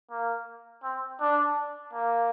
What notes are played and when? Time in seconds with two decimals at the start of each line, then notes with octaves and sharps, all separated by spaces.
0.11 A#3
0.83 C4
1.20 D4
1.93 A#3